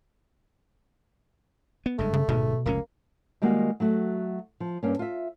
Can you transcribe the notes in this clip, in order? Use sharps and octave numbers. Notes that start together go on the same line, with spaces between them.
B3
F#1 G2 G#3 A3
C#3
D1 G#2 B2 G#3
F1 C#2 A#3 C#4
D#3 G3 G#3 A#3 F#4
F#3 A3 F#4
F3
G2 A#3 C#4
F4 E5